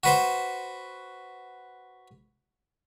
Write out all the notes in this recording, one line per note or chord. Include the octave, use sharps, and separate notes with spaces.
F#4 B4 C5